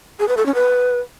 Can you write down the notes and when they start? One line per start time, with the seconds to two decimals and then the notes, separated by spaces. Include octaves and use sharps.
0.20 G#4
0.28 B4
0.37 A4
0.46 C#4
0.55 B4